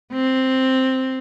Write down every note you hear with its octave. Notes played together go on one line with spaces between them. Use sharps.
C4